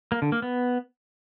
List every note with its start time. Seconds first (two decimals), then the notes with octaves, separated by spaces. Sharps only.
0.12 A#3
0.22 D3
0.32 A#3
0.42 B3